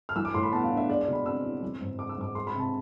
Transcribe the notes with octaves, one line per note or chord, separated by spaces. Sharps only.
F6
E3 E6
D6
A2 C6
B5
B3 A5
F5
D4
E5
G#3 D5
D5
B2
B5
C4 E6
E4
E3
G#2
G#3 D6
E6
G#2 D6
G#3 C6
B5
C3
A5